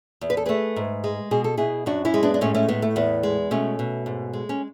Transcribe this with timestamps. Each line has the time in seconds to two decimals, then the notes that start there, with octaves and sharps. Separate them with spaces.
0.21 E2
0.30 B4
0.37 A4
0.46 A3 G#4 B4
0.76 G#2
1.04 G#3
1.31 B2 G#4
1.44 A4
1.57 B2 E4 G#4
1.86 F#2 D4 F#4
2.05 C#4 E4
2.14 G#3
2.23 B3 D4
2.34 D4
2.41 A2 A3 C#4
2.55 A3 C#4
2.68 A2 B3
2.82 A3
2.96 E2 B3
3.23 G#3
3.51 B2 A3 C#4
3.79 B2
4.06 G#2
4.33 G#3
4.49 C#4